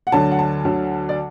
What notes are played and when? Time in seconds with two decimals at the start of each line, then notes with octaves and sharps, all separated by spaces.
0.07 F#5
0.12 D2 D3 F#3 A5
0.31 F#5
0.39 A5
0.65 D2 D3 F#3
1.09 D5